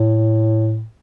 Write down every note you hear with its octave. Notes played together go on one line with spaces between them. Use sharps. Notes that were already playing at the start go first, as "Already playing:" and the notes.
Already playing: A2